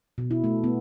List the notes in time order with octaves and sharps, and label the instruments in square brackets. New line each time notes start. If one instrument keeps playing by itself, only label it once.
[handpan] B2
E4
A3
B3